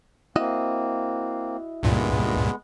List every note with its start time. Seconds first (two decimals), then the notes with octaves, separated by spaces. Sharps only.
0.36 A#3 C4 E4 F#4 D#5
1.83 C#2 G2 A#2 G#3 B3